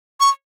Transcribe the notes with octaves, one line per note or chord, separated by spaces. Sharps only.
C#6